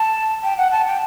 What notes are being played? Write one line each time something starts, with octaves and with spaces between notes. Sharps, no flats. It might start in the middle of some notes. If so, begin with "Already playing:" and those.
Already playing: A5
G5
F#5
A5
G5